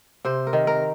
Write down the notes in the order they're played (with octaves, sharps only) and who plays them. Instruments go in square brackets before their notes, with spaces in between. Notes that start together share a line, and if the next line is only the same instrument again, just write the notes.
[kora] C3 C5
A#4
D#3
A#4